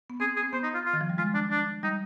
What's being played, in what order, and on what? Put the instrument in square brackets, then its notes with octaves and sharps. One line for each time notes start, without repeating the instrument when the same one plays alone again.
[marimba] B3
[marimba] C4 [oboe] G#4
[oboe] G#4
[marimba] C4
[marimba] B3 [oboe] C5
[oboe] D#4
F4
F4
[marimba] D#3
F3
G3
[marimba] G#3 [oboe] F4
[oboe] D4
D4
[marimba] G3 [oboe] D#4